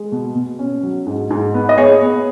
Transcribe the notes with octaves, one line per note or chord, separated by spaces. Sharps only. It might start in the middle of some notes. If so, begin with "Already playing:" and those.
Already playing: G#3
B2
B2
C#4
F#3
G#2
G#2
B3
D#5
B3 G#4 C#5
B3